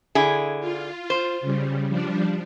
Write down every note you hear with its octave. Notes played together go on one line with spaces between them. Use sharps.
D3 E4 G#4
F4
C5
C#3 G3
F3 G3 D4